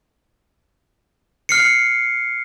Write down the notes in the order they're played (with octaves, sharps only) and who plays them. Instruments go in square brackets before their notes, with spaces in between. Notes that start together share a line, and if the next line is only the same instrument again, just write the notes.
[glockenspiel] F6 C7 C#7